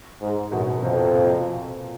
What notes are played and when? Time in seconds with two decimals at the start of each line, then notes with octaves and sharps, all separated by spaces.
0.21 G#2
0.51 F#2 B2
0.83 F2 C3
1.14 A#2